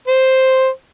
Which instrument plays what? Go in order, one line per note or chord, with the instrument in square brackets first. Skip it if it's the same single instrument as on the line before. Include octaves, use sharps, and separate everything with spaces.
[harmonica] C5